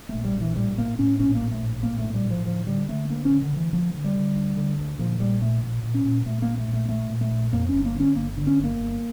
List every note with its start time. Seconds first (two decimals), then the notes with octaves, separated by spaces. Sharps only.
0.09 A#1 A3
0.25 G3
0.35 A#1
0.41 E3
0.56 A2 G3
0.78 A2 A#3
0.99 A2 C#4
1.19 A#1 C#4
1.35 A#3
1.40 A#1
1.51 A3
1.61 A2
1.82 A#1 A#3
1.98 A3
2.04 A2
2.14 G3
2.25 A2
2.30 F3
2.46 D2 F3
2.67 D3 G3
2.88 D3 A3
3.09 D2 A#3
3.25 C#4
3.30 D3
3.42 D3
3.52 D2 E3
3.73 D2 F3
3.94 D3
4.04 G3
4.15 D3
4.36 D2
4.57 D3
4.78 D2
4.99 A#2 F3
5.20 A#1 G3
5.41 A#2 A3
5.63 A#2
5.83 A#2
5.94 C#4
6.04 A#2
6.25 A#2 A3
6.42 A#1 A#3
6.57 A3
6.68 A#2
6.73 A3
6.89 A#2 A3
7.10 A#2
7.21 A3
7.31 A#1
7.52 F2 A#3
7.69 G1 C#4
7.85 A#3
7.94 D3
8.00 C#4
8.15 G1 A#3
8.37 D3
8.47 C#4
8.58 G1
8.64 A#3
8.80 G1